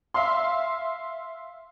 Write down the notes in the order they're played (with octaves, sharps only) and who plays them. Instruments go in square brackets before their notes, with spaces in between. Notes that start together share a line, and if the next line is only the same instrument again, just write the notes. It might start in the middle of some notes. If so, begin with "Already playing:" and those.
[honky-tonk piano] E5 F5 C6